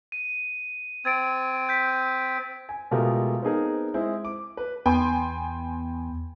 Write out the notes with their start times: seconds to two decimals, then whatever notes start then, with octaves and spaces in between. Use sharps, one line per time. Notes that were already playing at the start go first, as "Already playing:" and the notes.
0.12 D#7
1.05 C4 G#6 A6 D7
1.69 G6 B6
2.69 G#5
2.91 B2 G#3 A3 F4 G4 A#4
3.42 B3 C4 D#4 G#4 A#4
3.94 G#3 C4 E4 C5
4.25 D6
4.57 B4
4.86 E2 B3 G5 G#5 C6